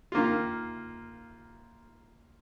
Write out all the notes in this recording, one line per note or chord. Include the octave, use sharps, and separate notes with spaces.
D#3 A#3 F4